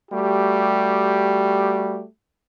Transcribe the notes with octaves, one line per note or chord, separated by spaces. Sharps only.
G3 A3 F#4 G4